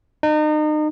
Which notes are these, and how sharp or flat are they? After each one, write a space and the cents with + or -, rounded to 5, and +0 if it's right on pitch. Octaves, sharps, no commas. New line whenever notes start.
D#4 -35